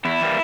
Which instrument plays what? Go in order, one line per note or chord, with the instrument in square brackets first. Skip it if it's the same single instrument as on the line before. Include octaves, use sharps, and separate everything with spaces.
[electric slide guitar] E2 E4
E3 G3 A#3